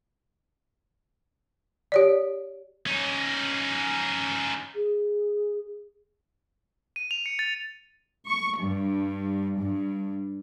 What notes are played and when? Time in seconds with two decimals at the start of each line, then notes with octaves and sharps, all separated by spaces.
1.92 G4 C#5 D5
2.87 C#4 D#4
4.75 G#4
6.96 D#7
7.11 F7
7.26 C#7
7.39 A6
8.27 C#6
8.59 G2
9.60 G2